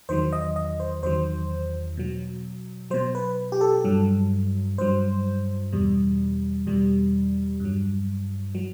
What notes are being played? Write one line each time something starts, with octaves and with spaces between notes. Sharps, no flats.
E2 D#3 F#3 C5
D#5
D#5
C5
E2 D#3 F#3 C5
B2 F#3
B2 F#3 C5
B4
G4
A4
G2 F#3
G2 F#3 C5
E2 B2 G3
E2 B2 G3
G2 F#3
F#3